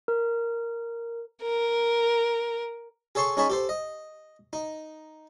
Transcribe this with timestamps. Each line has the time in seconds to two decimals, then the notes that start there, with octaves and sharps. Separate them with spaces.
0.08 A#4
1.43 A#4
3.15 G#4 A4 C#5 A5 C6 C#6
3.37 C#4 D#4 G#4 C#5 A5 B5
3.50 G4 A4 C5
3.69 D#5
4.53 D#4